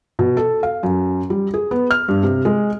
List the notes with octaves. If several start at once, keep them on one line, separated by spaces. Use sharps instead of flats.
B2
A4
F5
F#2
G3
G#4
B3
F6
G2
C3
G#3